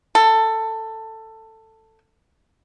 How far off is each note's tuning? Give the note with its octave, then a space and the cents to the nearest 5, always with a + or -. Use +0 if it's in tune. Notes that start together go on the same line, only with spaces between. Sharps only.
A4 +15